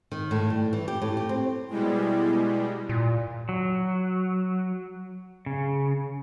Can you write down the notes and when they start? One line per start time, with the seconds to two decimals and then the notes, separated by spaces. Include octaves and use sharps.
0.12 D#3
0.31 A2
0.50 G3
0.73 E3
0.88 G4
1.02 A2
1.17 G4
1.29 C4
1.70 B2 G3 G#3 E4
2.89 A#2
3.49 F#3
5.46 C#3